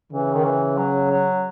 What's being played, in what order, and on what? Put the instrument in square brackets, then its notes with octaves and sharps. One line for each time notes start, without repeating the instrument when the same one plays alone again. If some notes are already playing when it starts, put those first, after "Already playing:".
[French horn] C#3 [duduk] E3
[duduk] D#3
E3
F#3
F#3